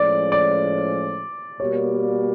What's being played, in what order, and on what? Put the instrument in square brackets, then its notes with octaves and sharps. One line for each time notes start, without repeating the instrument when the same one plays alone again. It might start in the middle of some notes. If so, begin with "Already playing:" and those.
Already playing: [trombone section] A2 F3 G#3 C#4 [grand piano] D5
[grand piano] D5
[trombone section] B2 G3 A#3 [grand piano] C#5